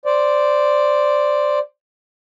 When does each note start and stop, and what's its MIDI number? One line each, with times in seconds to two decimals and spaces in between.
0.05 1.59 72
0.05 1.59 74